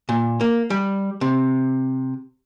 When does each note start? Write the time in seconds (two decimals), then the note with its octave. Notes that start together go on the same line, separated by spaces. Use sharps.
0.09 A#2
0.41 A#3
0.70 G3
1.21 C3